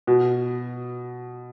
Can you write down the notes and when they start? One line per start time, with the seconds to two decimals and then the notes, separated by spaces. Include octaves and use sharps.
0.07 B2